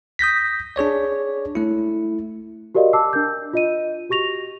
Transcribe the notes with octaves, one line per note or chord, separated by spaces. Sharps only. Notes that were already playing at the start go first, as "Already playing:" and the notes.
D#6 G6 A#6 B6
D4 G#4 C#5 D5
A3 E4
F#4 G4 A#4 D5 D#5 F5
A5 D6 E6 C7
D4 A#4 G6
F4 D#5 D#7
F#4 G4 C#6 A#6 F7